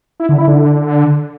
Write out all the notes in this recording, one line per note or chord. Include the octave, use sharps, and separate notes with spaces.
E4
D3
E4
D3